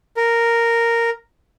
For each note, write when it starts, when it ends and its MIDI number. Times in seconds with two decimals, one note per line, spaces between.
0.17 1.10 70